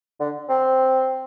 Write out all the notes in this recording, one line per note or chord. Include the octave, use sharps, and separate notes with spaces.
D3
C4